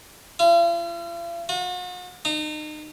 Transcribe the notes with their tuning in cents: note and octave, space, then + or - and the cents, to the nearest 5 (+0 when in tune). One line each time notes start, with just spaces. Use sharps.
F4 -45
F#4 -45
D#4 -35